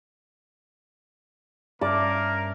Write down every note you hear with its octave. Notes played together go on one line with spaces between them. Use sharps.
G2 A#3 C#4 A#4 D5 E5 A5 D6